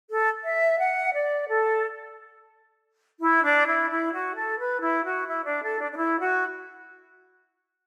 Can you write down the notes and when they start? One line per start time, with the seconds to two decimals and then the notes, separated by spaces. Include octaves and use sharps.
0.10 A4
0.44 E5
0.79 F#5
1.13 D5
1.48 A4
3.20 E4
3.43 D4
3.67 E4
3.89 E4
4.13 F#4
4.35 A4
4.59 B4
4.81 E4
5.04 F#4
5.28 E4
5.45 D4
5.62 A4
5.80 D4
5.91 D4
5.97 E4
6.20 F#4